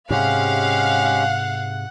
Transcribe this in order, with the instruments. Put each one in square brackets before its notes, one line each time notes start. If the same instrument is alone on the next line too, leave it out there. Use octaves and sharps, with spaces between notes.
[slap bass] G#2 C3 [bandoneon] G#3 C#4 G4 [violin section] F5 [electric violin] F#5